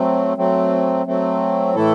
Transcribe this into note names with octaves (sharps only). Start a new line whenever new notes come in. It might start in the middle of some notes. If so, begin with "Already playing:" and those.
Already playing: F#3 A3 C4
F#3 A3 C4
F#3 A3 C4
A2 E3 A3 E4 A4